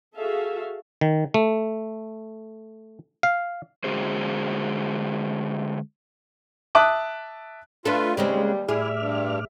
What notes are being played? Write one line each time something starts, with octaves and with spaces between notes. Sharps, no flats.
F#4 G#4 A4 E5 F5
D#3
A3
F5
D3 G#3 C#4 F#4 G#4 C5
E5 A5 D6 D#6 F#6
A3 D4 F4 A4 B4
D#2 C#3 G3 G#3 C4
A2 E4 G#4 D5 E5 F6
G2